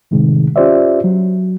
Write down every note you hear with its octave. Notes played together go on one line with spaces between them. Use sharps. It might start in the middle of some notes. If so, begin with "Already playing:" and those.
A2 C3 D#3 G#3
C#4 F4 G4 C5 D5 E5
F#3